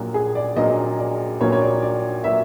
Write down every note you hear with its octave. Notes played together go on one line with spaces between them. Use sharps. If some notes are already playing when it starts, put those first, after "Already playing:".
Already playing: A#1 A#2 F#3 A#3 F#4
G#4
D5
A#1 A#2 F#3 A#3 D#5
D5
A#1 A#2 F#3 A#3 C#5
C#5
D5
D5
A#2 F#3 A#3 E5